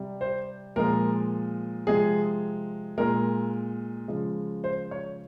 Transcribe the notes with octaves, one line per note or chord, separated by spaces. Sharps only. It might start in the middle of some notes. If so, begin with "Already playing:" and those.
Already playing: C3 G3
C5
A#2 F3 G#3 A#4
C3 F3 G#3 G#4
A#2 G#3 A#4
C#3 F3 G#3
C5
C#5